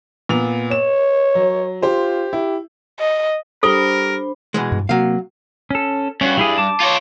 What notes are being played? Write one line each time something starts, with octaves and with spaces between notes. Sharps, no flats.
A#2 B3 F7
C#5 E7
F#3
F4 G4 C5
E4 G4
D#5
G3 D4 A4 A#4 C5 B5 G7
B2 E3 G#3
G2
C3 F#3 A#3 F5
C#4 A4
G2 C#4 F#4
G3 E4 G#4
A5 D6
F4 C#5